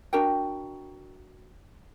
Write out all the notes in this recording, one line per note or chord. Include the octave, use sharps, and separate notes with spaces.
D4 F#4 A#4 G5